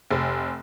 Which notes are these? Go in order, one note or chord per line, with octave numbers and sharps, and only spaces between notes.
F1